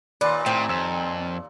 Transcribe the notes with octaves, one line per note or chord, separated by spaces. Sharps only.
D#2 A#2 B4 D5 C6
A2 C4 G5
F2 E6